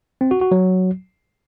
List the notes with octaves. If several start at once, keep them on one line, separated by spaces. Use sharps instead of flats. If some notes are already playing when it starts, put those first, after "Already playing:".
C4
F#4
F#4
F#3